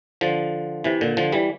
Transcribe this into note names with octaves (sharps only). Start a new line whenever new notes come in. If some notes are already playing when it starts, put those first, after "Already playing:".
D3 F3
C3 E3
A#2 D3
D3 F3
E3 G3